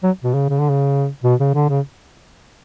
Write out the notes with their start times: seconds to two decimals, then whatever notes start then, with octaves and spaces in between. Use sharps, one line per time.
0.03 F#3
0.24 B2
0.34 C#3
0.49 C#3
0.59 D3
0.70 C#3
1.24 B2
1.40 C#3
1.54 D3
1.69 C#3